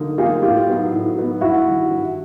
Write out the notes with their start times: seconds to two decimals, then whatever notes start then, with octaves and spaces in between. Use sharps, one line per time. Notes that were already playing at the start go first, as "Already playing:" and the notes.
Already playing: D3 F#3 A#3 D#4
0.18 F#3 A#3 D#4 F4 G4 G#4
0.42 A2 F4 G4
0.67 F#3 B3 D#4 F#4
0.92 A2
1.17 F#3 B3 D#4 F#4
1.41 G2 E4 F#4
1.66 D#3 G3
1.91 G2